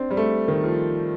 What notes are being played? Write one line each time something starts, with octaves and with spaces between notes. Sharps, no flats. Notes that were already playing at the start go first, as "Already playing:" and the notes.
Already playing: C4 D4
G3
A3
D#3
F3